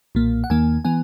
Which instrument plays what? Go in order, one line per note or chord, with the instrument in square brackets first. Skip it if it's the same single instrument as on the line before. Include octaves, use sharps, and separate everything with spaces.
[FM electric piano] B1 A#2 A#3
F#5
D#2 D#3 A#3 G#5
E3 B3 G#5